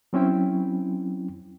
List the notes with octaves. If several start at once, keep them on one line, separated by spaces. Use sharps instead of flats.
F#3 C4 C#4 E4 G5